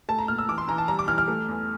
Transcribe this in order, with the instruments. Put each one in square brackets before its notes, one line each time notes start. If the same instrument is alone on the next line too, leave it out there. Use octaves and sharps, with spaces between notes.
[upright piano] A3 A5
A#5
A#2 F6
E6
E3 D6
C6
E3 A#5
A5
G3 A#5
D6
E3 F6
F6
A3
E2